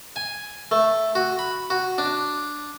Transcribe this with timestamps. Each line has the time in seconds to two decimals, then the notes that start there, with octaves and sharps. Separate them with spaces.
0.16 G#5
0.71 A3
1.15 F#4
1.39 B5
1.70 F#4
1.98 D4